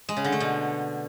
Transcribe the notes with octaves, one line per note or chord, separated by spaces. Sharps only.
G#3
C#3
D3
A3
B2